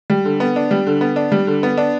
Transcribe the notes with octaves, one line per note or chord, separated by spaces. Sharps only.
G3
D3
B3
D4
G3
D3
B3
D4
G3
D3
B3
D4